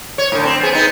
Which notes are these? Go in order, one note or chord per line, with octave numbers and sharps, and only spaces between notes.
C#5
A2 D3
C4
B3 G#4
B3 C4 D#4